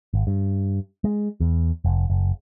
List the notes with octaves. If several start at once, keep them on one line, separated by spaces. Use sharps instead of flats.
G#1
G2
G#3
E2
F1
F#1